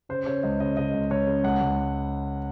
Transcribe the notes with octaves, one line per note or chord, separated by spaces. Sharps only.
C#3 C5
C#3 C#5
C#2 D#5
C#3 D#5
C#3 D#5
C#2
C#2 C#5
C#3
C#2 F#5
C#2